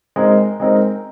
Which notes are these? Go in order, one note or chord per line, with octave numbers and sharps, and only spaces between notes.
G#3 C4 D#4 A#4
G#3 C4 D#4 A#4